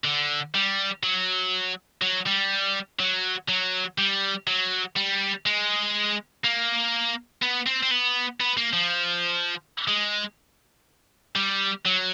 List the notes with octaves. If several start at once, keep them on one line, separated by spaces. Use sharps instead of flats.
D3
G3
F#3
F#3
G3
F#3
F#3
G3
F#3
G3
G#3
A#3
B3
C4
C4
B3
B3
A#3
F3
G#3
G3
F#3